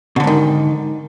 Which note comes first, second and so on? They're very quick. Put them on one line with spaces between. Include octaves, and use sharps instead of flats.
B2 D3 G#2 D#3